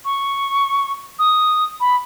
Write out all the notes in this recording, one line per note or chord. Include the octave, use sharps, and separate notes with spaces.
C#6
D#6
B5